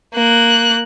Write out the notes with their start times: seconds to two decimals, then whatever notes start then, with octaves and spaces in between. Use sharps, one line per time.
0.14 A#3 F#6